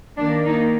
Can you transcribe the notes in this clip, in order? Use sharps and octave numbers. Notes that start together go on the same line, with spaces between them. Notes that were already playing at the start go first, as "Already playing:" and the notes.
D#3 A#3 D4
D#4